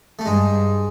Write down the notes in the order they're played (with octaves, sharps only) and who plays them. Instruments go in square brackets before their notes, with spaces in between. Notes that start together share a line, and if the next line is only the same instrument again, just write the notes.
[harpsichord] A3
[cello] G2 [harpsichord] G#3